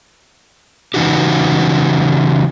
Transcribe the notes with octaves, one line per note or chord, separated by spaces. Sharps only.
C#3 E3 D#4 F#4 G4